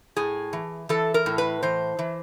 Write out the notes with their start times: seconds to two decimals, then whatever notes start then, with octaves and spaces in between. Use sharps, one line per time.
0.16 A2 G#4
0.53 E3
0.89 E3 A4
1.14 A#4
1.26 A2
1.38 B4
1.63 E3 C5
1.99 E3